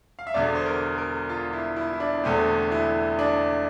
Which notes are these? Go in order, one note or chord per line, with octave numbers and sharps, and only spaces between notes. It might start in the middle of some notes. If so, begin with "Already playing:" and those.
F5
E5
E1 E2 D3 D5
C5
A#4
A#4
F4
E4
E4
E4
D4
E1 E2 D3 A3 C4
E4
D4